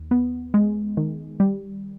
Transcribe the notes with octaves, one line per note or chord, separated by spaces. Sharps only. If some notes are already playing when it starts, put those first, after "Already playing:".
Already playing: D#2
B3
G#3
D#3
G3